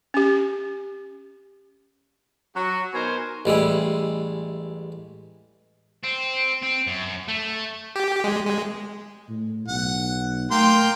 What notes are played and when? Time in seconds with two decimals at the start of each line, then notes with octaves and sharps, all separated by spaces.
0.14 C#4 G4
2.55 F#3 F#4
2.93 B2 D#4 A#4 C5 G#5
3.45 A1 G3 G#3 E4
6.03 C4
6.63 C4
6.87 F#2
7.28 A3
7.96 G4
8.24 G#3
8.46 G#3
9.29 A2
9.68 B1 F#5
10.51 A3 A#3 G5 C6